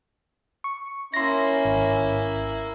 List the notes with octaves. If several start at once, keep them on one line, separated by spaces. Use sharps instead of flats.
C#6
A#3 C#4 E4 C6 A#6
G#1